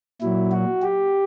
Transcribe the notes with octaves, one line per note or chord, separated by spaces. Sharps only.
A#2 F#3 E4
F#4
G4